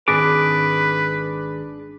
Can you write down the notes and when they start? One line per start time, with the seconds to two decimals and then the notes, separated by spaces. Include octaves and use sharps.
0.08 G#1 D4 G#4 B4 D6